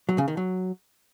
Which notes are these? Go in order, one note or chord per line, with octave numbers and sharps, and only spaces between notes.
F#3
C#3
D#3
F#3